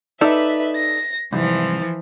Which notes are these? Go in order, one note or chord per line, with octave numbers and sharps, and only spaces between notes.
D#4 A4 B4 D5 E5
A#6
C2 G#2 E3 F3